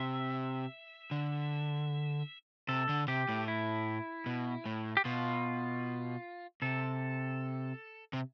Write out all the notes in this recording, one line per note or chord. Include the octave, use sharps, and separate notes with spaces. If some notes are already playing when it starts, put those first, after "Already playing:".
Already playing: C3 E5
D3
C3 A4
D3
C3 G4
A2
E4
B2
A2
G4
B2 F4
C3 A4
C3